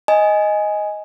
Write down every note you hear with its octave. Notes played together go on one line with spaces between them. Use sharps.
D#5 G#5